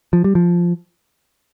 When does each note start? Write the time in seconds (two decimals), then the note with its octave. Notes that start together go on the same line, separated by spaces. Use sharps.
0.13 F3
0.24 G3
0.35 F3